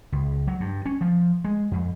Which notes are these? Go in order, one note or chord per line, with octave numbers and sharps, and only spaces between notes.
C#2
F#3
G2
C#4
F3
G#3
F2